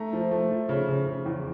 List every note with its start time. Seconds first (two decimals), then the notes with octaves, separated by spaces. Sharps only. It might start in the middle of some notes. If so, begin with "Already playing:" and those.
Already playing: A3 A#5
0.13 F3
0.31 A3
0.51 F3
0.69 C#3
0.89 C#3
1.07 C#3
1.26 E2